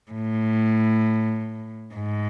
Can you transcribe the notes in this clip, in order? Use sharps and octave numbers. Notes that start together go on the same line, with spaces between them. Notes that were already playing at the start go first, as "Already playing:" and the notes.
A2
G#2